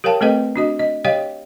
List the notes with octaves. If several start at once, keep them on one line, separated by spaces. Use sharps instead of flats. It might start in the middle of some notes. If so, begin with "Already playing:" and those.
G4 A#4 C#5 F5 G5 A5
A3 C4 A4 B4 D#5 G5
D4 F#4 D#5
D#5
G4 C#5 D#5 F5 G5